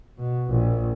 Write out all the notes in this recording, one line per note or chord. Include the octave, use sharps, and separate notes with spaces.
B2
A#1